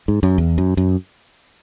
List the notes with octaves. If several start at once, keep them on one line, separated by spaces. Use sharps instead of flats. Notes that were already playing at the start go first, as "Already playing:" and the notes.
G#2
F#2
E2
F#2
F#2